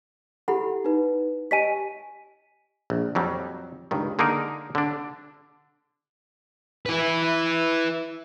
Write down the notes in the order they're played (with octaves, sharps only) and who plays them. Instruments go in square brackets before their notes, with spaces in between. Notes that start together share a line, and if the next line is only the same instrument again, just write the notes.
[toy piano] E4 F#5 B5 [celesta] G4 A4
[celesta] D#4 B4
[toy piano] G4 D#5 G#5 [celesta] B6 D#7
[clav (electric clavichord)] A#1
F2 F#3 G3
C#2 G2 D#3
D3 A#3 D#4 G#4 A#4
D3 D4
[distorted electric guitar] E4 B4